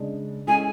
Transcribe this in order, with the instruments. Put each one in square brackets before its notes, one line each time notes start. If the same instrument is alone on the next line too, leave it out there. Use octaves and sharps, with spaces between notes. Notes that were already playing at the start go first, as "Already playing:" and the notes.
Already playing: [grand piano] C#3 G#3 D4
[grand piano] G#3 C#4 E4 A4 [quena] G#5